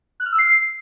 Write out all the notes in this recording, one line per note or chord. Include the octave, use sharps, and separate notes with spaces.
F#6
F6
E6
C7